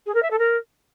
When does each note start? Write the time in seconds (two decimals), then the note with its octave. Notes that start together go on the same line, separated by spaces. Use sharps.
0.06 G#4
0.15 A#4
0.23 E5
0.31 A4
0.39 A#4